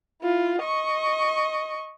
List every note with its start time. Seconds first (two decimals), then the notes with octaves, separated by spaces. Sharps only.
0.22 E4 F4
0.60 D#5 C#6